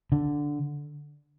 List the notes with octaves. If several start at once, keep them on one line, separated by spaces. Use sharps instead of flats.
D3